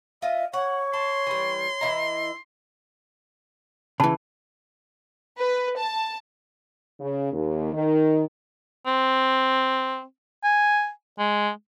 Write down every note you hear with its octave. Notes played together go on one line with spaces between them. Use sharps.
F4 D#5 E5
C#5 F#5 C#6
A5 C6
E3 G3
E3 E4 D#5 A#5
C#3 E3 A5 B5
B4
A5
C#3
D#2
D#3
C4
G#5
G#3